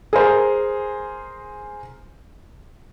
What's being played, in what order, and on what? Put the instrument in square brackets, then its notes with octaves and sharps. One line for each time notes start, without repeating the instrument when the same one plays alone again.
[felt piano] G#4 A#4 C5